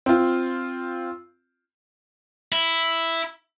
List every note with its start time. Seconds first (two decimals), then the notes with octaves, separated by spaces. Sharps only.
0.06 C4 F4
2.52 E4